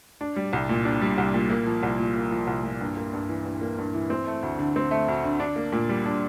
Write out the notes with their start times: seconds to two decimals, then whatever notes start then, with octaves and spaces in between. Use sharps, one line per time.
0.21 D4
0.36 G3
0.53 C2
0.69 A#2
0.85 D4
1.02 G3
1.18 C2
1.34 A#2
1.50 A#3
1.67 F3
1.83 C2
1.99 A#2
2.16 A#3
2.32 F3
2.47 C2
2.63 A#2
2.81 G2
2.97 A#3
3.13 G2
3.29 E3
3.45 G2
3.61 A#3
3.78 G2
3.94 E3
4.10 C4
4.27 A3
4.43 D2
4.59 D3
4.76 C4
4.91 A3
5.08 D2
5.24 D3
5.40 D4
5.56 A#3
5.72 A#2
5.89 G3
6.06 D4